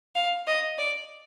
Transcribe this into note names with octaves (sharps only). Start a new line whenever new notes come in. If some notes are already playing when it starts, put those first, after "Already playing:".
F5
D#5
D5